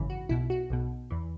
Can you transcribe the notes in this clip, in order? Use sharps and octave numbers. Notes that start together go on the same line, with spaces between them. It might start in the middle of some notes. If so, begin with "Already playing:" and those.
Already playing: G#1 F#2 C#3 E3
F#4
B1 B2 E4
F#4
B1 B2
E2 E3